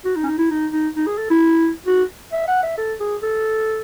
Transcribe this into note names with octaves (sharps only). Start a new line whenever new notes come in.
F#4
D#4
C#4
D#4
E4
D#4
D#4
D#4
G#4
A4
E4
F#4
E5
F#5
E5
A4
G#4
A4